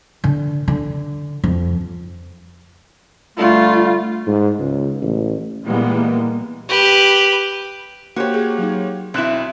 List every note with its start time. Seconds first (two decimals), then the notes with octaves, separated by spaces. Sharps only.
0.24 D3
0.68 D3
1.44 F2
3.38 D3 G3 A3 F4
4.27 G#2
4.58 C#2
5.01 A1
5.65 A#2 E3 G3 G#3 A#3 B3
6.69 G4 B4
8.16 A#3 F#4 G4 C5 C#5
8.34 G#4
8.58 F#3 D#4
9.14 B1 C4 E4 F#6 E7